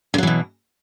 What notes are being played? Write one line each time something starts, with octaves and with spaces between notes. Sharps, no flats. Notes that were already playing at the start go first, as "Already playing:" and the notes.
B2 D3 E3 F#3